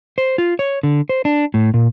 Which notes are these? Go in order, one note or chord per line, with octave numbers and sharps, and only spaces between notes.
C5
F4
C#5
D3
C5
D4
A2
A#2